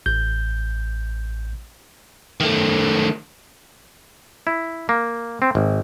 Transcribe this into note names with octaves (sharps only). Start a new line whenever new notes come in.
A1 G6
D#3 A3
E4
A#3
C4
G#1